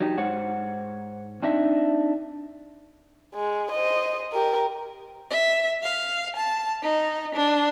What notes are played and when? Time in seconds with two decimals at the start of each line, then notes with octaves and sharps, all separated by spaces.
0.01 F#3 D#4 G4
0.17 G#2 C5 C#5 F#5
1.42 C4 D4 D#4 D#5 E5
3.35 G#3
3.72 C5 D#5
4.33 G4 A#4
5.31 E5
5.83 F5
6.36 A5
6.83 D#4
7.34 D4